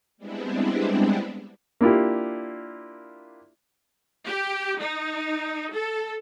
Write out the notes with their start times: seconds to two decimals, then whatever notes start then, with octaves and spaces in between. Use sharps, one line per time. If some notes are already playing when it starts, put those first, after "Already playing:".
0.17 G3 G#3 B3 C4 D4 E4
1.81 A#3 D4 E4 F4 G4
4.26 G4
4.80 D#4
5.73 A4